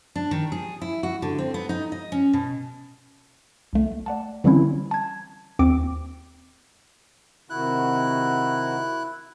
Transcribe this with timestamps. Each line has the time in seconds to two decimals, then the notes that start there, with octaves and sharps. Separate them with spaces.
0.16 D4
0.31 D#3
0.52 G#4
0.82 E4
1.03 F#4
1.22 D3
1.38 C4
1.54 B3
1.69 D#4
1.92 D#5
2.12 C#4
2.33 B2
3.73 C2 A3
4.06 D5 F#5 A5
4.44 D3 E3 G3 C4 C#4 E4
4.91 A5 G#6
5.59 D#2 C4 D6 D7
7.50 C3 D#3 E4 F#4 F#6